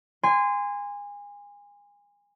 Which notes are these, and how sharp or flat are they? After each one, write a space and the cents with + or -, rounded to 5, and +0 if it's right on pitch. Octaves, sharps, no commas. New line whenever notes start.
G#5 -25 C6 -20